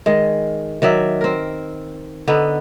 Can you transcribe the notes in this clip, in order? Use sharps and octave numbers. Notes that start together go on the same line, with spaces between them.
D#3 G#3
D#3 F#3 D5 E5
C4 A#4
D3 B3 D#4